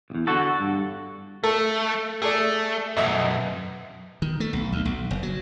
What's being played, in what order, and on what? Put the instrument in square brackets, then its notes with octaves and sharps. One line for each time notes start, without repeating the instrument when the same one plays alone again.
[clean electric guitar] B1 E2
D3 F#4 A4
G2
[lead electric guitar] A3 [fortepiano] A4
[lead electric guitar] A3 [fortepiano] G#4 A4 D5
[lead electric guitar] B1 F#2 [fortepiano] D#5 E5 E6
[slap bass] D#3
A3
B1
D2
B1
F#1
F#3